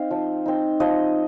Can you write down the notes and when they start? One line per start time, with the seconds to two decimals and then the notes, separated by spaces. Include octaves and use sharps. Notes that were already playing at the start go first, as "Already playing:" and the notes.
Already playing: C4 D#4 F5
0.11 F3
0.46 C4 D#4
0.80 F3 D#5